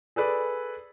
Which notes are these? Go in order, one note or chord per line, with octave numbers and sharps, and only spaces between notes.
G#4 A4 B4 D5